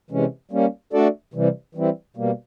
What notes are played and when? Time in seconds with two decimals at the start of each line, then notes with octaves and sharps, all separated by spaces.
0.10 C3 E3 G#3 C#4
0.51 G3 A#3 C#4
0.93 A3 D4 F#4 A4 D5
1.34 C3 E3 G3
1.75 E3 G3 C4 E4
2.16 B2 G3 A#3